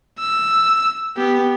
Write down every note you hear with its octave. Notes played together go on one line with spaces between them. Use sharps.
E6
B3 G4